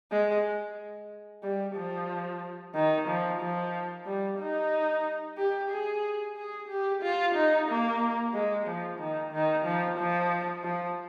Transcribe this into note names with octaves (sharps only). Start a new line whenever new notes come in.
G#3
G3
F3
D#3
F3
F3
G3
D#4
G4
G#4
G#4
G4
F4
D#4
A#3
G#3
F3
D#3
D#3
F3
F3
F3